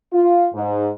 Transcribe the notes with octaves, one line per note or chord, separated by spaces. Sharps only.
F4
G#2